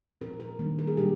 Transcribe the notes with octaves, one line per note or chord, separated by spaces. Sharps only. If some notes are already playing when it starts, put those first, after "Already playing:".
A#2 F3 C4 A#4
A#4
D#3 G3 A#3 D4
A#4
G#4
A#2 G3 D4 G4